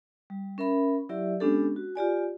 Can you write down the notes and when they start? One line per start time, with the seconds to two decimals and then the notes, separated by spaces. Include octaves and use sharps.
0.30 G3
0.58 C#4 A#4 E5 B5
1.09 F#3 E4 G4 D5 E5
1.40 G#3 B3 C#4 D4 G4 A4
1.76 F#4
1.96 F4 G4 D5 G#5